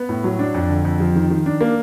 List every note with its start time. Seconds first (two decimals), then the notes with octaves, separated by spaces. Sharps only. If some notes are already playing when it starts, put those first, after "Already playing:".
Already playing: B3
0.09 A2
0.24 F#3
0.39 D4
0.54 F2
0.70 D3
0.85 F2
1.00 F3
1.15 D#3
1.30 D#3
1.46 D4
1.61 A#3